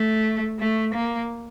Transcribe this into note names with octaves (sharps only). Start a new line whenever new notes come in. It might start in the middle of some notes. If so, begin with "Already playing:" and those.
Already playing: A3
A3
A#3